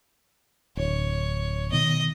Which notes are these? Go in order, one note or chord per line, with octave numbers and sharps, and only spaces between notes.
D1 C#5
B2 D#3 D#5